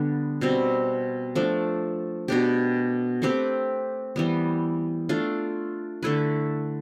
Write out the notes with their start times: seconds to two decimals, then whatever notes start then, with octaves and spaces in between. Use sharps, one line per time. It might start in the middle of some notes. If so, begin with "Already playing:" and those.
Already playing: D3 G3 B3 D4
0.41 B2 G3 C4
1.35 F3 A3 D4
2.28 B2 B3 D4 G4
3.22 A3 C4 G4 B4
4.16 E3 G3 B3
5.09 A3 D4 F4
6.03 D3 A3 E4 B4